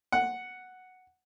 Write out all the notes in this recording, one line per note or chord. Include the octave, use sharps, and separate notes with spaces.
F#5